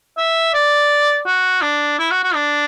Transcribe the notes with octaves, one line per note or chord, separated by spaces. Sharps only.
E5
D5
F#4
D4
E4
F#4
F#4
D4